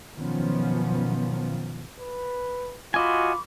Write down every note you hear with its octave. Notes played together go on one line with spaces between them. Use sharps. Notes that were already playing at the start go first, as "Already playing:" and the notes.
F#2 B2 D#3 F3 B3 C#4
B4
F4 F#4 D#5 G#5 B5 C#6 D6